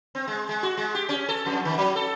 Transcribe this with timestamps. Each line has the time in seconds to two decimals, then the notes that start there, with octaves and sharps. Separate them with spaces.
0.15 C4
0.28 G#3
0.49 G#3
0.63 F#4
0.77 G#3
0.95 G4
1.09 C#4
1.29 A4
1.46 F2
1.65 D#3
1.78 F#3
1.96 A4